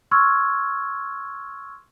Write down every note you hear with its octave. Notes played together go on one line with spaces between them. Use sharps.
C6 C#6 E6 F6 G#6